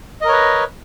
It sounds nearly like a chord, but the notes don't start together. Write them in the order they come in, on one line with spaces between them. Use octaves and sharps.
D#5 A#4 C#5 B4